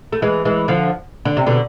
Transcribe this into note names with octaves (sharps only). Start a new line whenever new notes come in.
A3
E3 G#3
E3 G#3
D3 F3
D3
C3
B2 D3